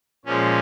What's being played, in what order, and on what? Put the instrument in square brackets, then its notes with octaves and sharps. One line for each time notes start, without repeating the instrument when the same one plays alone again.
[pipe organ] A#2 F3 G#3 C#4